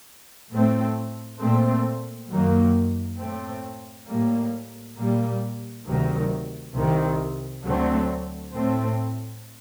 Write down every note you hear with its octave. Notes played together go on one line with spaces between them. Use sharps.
A2 A3 C4
A#2 A3 C4
F#2 D#3 F#3 A#3
A2 A3 C4
A2 G3 A#3
A#2 G3 A#3
D2 C3 D#3 F#3
C2 C3 D#3
D2 D3 F#3 A3 C4
A2 A3 C4